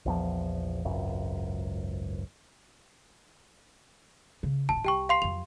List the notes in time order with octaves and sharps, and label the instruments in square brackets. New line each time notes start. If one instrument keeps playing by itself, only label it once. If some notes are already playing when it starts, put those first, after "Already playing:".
[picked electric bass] A#1 E2 F3
G#1 C#2 F#2
[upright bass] C#3
[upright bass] D#1 A1 [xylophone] A5
[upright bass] C2 [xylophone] G4 G5 C#6
[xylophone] F5 C6 C7
[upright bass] F2 F#3 [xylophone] F7